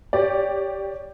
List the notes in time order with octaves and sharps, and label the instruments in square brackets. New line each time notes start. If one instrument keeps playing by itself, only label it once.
[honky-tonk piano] G4 C#5 D5